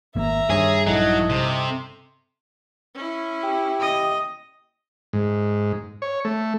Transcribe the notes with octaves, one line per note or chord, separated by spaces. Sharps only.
G#1 A#3 E5 A#5
G2 D#3 G#4 C#5 A#6
A#1 F#3 D#4 E4 A4 D#5
C3
C#4 E4
G4
D#5
G#2
C#5
A3